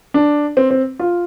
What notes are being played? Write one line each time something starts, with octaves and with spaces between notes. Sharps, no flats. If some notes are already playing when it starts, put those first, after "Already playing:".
D4
C4
C4
F4